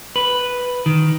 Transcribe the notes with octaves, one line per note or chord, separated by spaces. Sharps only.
B4
D#3